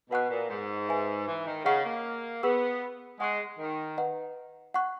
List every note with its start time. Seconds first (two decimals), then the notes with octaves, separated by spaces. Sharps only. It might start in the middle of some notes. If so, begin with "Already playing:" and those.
0.10 B2 B4 F#5 C#6 F#6
0.29 A#2
0.50 G#2
0.89 B4 E5 G#5
1.27 E3
1.46 D#3
1.65 C#3 G#4 D#5 F#5 C#6
1.85 A#3
2.43 B3 G#4 B4 F#5 C#6 E6
3.20 G#3 F#5 C#6 F#6
3.58 D#3
3.97 B4 D#5 F#5 A#5
4.74 F#5 C#6 F#6